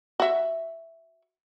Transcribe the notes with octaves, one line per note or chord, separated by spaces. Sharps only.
F#4 E5